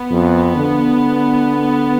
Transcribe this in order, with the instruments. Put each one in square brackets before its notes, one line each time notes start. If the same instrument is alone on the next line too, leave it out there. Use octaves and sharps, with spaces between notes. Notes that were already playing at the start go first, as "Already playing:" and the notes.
Already playing: [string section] B3
[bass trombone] F2
D3